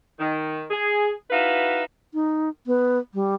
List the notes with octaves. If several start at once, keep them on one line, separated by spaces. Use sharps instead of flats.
D#3
G#4
D#4 E4 F#4 B4 E5 F5
D#4
B3
G3